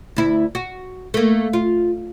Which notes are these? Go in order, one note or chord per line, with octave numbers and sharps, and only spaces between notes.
D2 E4
F#4
A3 A#3
F4